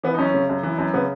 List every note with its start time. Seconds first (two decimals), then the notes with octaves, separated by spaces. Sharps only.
0.04 E3 B3
0.14 D#4
0.18 F#2 C#4
0.34 C#3
0.49 F#2
0.63 E3
0.78 F#2
0.94 C#3 B3